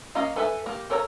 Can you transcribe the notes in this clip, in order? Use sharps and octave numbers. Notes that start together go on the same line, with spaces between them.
A#3 C#4 D#5 F5 A#5
A4 B4 E5 G#5
A#3 G4
A4 A#4 C#5 D5 A#5